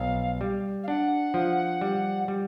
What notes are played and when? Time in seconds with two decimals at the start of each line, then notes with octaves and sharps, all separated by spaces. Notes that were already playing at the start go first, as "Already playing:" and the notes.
Already playing: B1 F3 F5
0.41 G3
0.83 F5
0.87 D4 F#5
1.34 F3
1.81 G3
2.28 G3